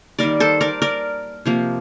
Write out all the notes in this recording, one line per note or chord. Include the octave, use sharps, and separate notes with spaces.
D#3 G3 A#3 A#4 D5
A4 C5
A#4 D5
A#4 D5
C3 F3 A#3